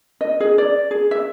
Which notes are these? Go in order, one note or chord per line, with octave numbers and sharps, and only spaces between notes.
D#5
G#4
D5
G#4
E5